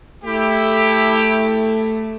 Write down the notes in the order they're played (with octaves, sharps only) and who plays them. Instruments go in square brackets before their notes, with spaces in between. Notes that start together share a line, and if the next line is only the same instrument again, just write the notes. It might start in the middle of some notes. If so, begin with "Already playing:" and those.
[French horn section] A3 [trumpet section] E4 G4